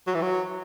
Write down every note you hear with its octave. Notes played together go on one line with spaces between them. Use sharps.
F#3
E3
F#3